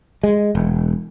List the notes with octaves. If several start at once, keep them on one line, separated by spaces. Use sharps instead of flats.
G#3
E1